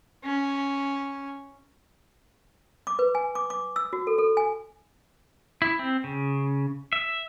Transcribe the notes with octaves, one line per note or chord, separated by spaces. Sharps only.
C#4
D6
B4
G#5
D6
D6
E6
F#4
A4
A4
G#5
E4
C4
C#3
E5